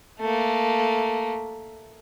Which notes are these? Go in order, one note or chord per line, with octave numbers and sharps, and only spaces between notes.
A3 A#3